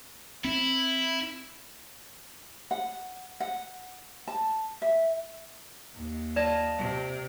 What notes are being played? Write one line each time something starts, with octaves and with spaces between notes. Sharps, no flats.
C4 E4
F#5
F#5
A5
E5
D#2
F4 D5 D#5 A5
C3